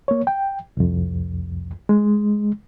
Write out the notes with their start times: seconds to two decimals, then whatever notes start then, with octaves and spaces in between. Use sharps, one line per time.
0.08 A#3 C#5
0.27 G5
0.77 C2 F2
1.89 G#3